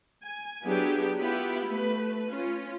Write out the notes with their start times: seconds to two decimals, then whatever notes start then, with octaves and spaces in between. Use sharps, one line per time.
0.23 G#5
0.65 F#3 B3 D4 E4 G4 G#4
1.18 B3 E4 F4 G4 B5
1.66 A3 B4
2.30 C#4 F4